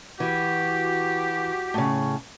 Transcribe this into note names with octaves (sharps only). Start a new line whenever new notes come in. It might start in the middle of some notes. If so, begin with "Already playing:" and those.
E3 F#4 G4
A2 C#3